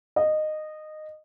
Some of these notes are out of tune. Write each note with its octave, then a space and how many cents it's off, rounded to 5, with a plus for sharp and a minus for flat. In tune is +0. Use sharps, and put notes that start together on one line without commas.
D#5 -15